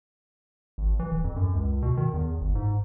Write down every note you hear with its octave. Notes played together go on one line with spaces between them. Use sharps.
G#1
E3
D#1
F2
F#2
C#2
B2
D#3
E2
G1
G#2